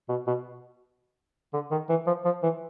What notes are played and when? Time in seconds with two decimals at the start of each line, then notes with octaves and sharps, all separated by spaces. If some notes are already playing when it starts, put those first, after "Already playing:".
0.09 B2
0.27 B2
1.53 D3
1.71 D#3
1.89 E3
2.06 F3
2.25 F3
2.43 E3